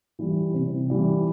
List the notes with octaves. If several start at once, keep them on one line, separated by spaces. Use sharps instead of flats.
E3 G3
C3
E3 G3